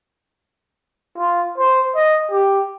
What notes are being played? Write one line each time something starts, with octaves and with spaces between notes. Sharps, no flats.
F4
C5
D#5
G4